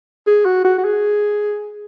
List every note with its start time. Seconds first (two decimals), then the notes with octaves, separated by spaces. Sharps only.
0.27 G#4
0.45 F#4
0.65 F#4
0.78 F#4
0.85 G#4